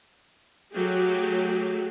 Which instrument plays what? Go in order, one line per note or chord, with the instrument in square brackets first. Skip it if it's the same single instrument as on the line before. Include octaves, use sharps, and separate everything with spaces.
[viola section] F#3 A3 G4 G#4